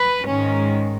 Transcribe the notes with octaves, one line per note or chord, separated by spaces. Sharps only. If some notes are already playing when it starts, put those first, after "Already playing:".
Already playing: B4
G#2 D#3 G#3 C#4